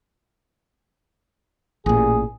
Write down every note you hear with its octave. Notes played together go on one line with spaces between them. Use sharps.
A1 A#2 G#4